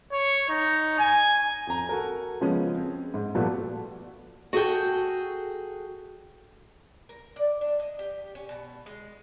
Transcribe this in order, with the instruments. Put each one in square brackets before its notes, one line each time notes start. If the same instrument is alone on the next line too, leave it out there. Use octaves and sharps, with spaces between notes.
[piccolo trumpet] C#5
D#4
G#5
[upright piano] F2 A#5
F#4 A4 A#4
C#3 F3 G#3 B3 C#4
C4
G#2
A#2 F3 G3 A3 B3 F#4
[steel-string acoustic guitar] F#4 G#4 A4 G5
[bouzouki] A#4
D5
D4
D#5
G4
C#4
B2
G#3